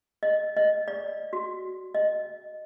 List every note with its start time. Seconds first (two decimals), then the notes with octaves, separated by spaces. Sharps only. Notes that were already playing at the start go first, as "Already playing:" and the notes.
0.23 D#5
0.57 D#5
0.88 D5
1.33 F#4
1.95 D#5